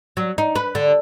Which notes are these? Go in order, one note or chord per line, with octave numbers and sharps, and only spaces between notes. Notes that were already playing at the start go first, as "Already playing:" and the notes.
F#3
D#4
B4
D3